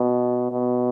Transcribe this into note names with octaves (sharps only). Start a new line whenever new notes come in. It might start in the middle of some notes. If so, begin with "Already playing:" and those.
Already playing: B2
B2